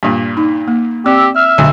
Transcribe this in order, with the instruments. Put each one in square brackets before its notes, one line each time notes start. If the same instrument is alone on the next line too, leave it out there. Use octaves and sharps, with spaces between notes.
[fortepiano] G2 A#2
[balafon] D#4
A#3
[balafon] C4 D5 [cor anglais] G4 [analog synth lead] E6
[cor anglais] E5 [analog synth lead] F6
[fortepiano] B1 [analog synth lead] D3